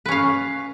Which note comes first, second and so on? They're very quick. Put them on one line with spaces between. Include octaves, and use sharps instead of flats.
B4 C#4 F5